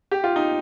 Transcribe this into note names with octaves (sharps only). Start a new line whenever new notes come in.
G4
F4
D#4